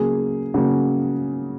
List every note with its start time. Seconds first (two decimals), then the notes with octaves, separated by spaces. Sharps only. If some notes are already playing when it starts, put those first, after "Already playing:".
Already playing: C#3 F#3 A#3 G#4
0.54 C#3 F#3 A#3 F#4